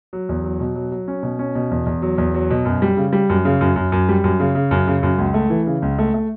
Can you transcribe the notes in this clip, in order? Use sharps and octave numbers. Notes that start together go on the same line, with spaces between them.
F#3
E2
F#3
B2
F#3
F#3
C#4
B2
C#4
B2
E2
E2
F#3
E2
F#3
B2
F#2
G3
C#3
G3
F#2
C#3
F#2
F#2
F#2
G3
F#2
C#3
C#3
F#2
C#3
F#2
C#2
A3
E3
C#3
C#2
A3
A3